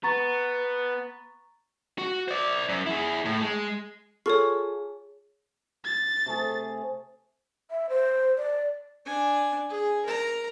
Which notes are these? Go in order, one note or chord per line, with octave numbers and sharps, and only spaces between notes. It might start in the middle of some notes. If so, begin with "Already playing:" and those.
B3 A#5 C#6 A6
F#4
C5 D5
F#2
E4 G#4
A2
G#3
F4 G#4 A4 C#5 C#6
A6
C3 A3 G#4
E5
C5
D5
D4 G#5
G#4
A#4 A#5